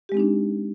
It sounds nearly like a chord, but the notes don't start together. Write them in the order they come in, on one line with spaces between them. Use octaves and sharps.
G4 G#3 C4 D#4 D4